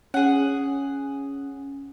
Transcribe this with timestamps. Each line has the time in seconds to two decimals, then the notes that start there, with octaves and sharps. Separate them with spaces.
0.14 C#4 G#4 F#5